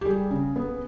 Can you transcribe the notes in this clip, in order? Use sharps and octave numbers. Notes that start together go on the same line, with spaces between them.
G4
G3 G#4
C#3
B3